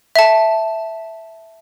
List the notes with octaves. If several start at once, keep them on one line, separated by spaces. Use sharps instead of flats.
E5 A5